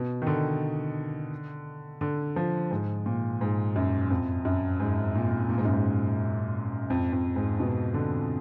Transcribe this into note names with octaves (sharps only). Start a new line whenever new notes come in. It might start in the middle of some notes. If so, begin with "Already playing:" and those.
Already playing: B2
D#3
D3
D3
F3
G#2
A#2
G#2
F#2
F2
F#2
G#2
A#2
A#2
G#2
F#2
G#2
F2
F2
G#2
B2
D3